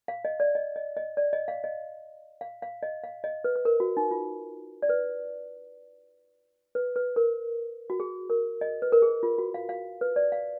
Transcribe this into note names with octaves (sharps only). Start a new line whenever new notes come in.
F5
D#5
D5
D#5
D#5
D#5
D5
D#5
F5
D#5
F5
F5
D#5
F5
D#5
B4
B4
A#4
F#4
D#4
F4
D5
B4
B4
B4
A#4
F#4
G#4
A#4
D#5
B4
A#4
G#4
F4
F#4
F5
F5
B4
D5
F5